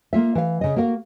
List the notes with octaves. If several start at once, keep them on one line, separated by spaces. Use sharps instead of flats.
A#3 F4 E5
E3 F5
C#3 D#5
A#3 F#4 A#4 F5